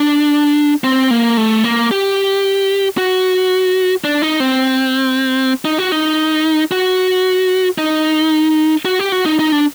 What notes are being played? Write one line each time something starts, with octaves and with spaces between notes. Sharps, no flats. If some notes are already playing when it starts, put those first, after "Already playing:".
Already playing: D4
C4
A#3
A3
A#3
G4
F#4
D4
D#4
C4
D#4
F#4
D#4
F#4
D#4
F#4
G4
F#4
D#4
D#4
D4